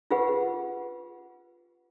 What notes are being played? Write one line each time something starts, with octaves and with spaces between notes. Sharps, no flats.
F4 G4 G#4 B4 F#5